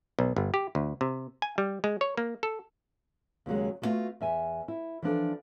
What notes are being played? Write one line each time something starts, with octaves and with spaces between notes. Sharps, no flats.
B1
G1
G4
D2
C3
G#5
G3
G#3
C#5
A#3
A4
D#2 C#3 F#3 G#3
G3 A3 B3 C4 F4 F#4
E2 E5 G#5
E4
E3 F3 D4 A4